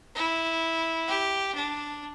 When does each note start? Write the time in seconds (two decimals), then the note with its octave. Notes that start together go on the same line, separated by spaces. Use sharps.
0.15 E4
1.08 G4
1.55 D4